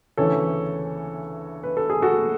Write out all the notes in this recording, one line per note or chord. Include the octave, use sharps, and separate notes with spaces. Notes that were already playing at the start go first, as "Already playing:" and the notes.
D2 C#3 E3 A4 C#5
B4
A4
G#4
F#4 A4